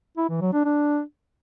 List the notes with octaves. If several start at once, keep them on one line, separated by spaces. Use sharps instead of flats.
E4
E3
F#3
D4
D4